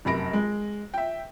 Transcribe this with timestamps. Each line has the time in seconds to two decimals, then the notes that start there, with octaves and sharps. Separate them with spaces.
0.05 F1 F#2 B5 A#6 D7
0.33 G#3
0.94 E5 G5